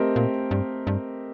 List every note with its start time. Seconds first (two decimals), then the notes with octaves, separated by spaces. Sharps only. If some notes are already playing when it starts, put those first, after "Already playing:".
Already playing: A3 C4 G4 A#4 D#5
0.16 A#2
0.51 G2
0.87 G2